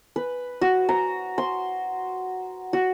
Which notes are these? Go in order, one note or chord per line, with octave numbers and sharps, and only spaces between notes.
B4
F#4
A#5
C6
F#4